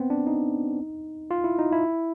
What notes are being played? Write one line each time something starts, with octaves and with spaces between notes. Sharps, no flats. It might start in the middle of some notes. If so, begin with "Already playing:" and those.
Already playing: B3 C4
D4
D#4
F4
E4
D#4
E4